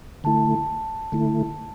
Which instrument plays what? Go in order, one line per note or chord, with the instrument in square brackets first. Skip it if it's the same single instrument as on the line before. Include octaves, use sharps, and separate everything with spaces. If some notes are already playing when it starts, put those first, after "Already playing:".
[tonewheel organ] D3 A3 E4 [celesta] A5
[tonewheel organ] D3 A3 E4